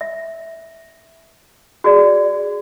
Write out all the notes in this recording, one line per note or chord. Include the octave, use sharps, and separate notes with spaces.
E5
F#4 G#4 D5